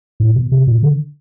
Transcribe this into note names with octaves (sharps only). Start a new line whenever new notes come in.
A2
B2
C3
A#2
D3